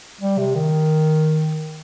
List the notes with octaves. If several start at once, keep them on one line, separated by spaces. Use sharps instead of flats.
G3
C3
D#3